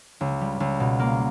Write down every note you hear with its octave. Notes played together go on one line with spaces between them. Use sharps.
C#2
G3
C#2
B2
A#3